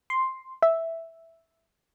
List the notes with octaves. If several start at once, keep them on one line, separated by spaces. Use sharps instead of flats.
C6
E5